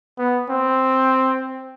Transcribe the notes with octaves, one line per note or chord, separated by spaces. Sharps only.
B3
C4